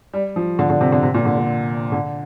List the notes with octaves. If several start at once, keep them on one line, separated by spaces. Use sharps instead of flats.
G3
F3
D3
D3
C3
D3
C3
A#2
D3
D3
D3